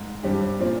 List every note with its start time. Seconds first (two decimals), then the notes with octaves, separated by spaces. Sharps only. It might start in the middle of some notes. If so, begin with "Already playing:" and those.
Already playing: G#2
0.23 G2 G3 C4 G4
0.59 A#2 F3 C4